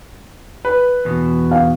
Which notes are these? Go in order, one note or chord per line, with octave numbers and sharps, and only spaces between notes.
B4
E2 B2
F5